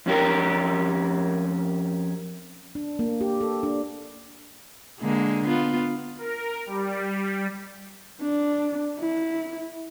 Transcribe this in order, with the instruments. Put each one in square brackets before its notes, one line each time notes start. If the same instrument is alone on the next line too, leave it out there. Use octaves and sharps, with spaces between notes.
[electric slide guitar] F2 C#4 G4 A#4
[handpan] D4
A#3
G4
A4
D4
[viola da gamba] D3 G#3 A#3
B3 F4
[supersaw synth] A#4
G3
[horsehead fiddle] D4
E4